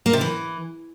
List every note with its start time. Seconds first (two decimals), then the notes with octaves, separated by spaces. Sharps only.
0.06 A#3
0.13 C3
0.21 E3